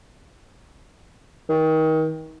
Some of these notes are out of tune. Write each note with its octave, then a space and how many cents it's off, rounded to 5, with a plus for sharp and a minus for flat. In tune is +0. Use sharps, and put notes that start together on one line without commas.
D#3 +30